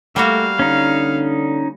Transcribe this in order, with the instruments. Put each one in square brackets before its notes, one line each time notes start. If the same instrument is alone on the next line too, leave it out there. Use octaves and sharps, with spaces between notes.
[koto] G3 A#3 F#4 [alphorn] A3 [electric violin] F5
[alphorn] D3 [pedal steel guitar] C#4 D#4